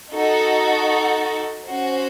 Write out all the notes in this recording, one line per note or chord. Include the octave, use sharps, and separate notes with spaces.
D#4 F#4 A4
C#4 F#4 C5